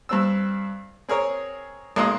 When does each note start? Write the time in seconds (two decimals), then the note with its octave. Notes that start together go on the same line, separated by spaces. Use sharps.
0.09 G2 C4 E6
1.09 C4 G#4 A#4 C#5
1.96 B1 G#3 A#3 C6 D#6